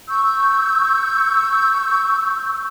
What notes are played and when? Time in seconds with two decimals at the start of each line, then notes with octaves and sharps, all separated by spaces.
0.07 C#6 E6 G6